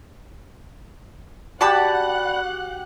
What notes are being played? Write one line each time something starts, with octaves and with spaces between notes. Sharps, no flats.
F#4 G4 D5 F#5 A5 B5 F#6